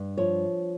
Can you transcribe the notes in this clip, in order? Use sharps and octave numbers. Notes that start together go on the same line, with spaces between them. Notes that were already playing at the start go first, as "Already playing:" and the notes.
Already playing: G2
F3 C#5